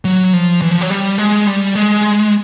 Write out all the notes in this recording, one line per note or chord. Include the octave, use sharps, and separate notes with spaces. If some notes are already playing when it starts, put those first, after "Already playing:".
F#3
F3
E3
F3
F#3
G3
G#3
G3
G#3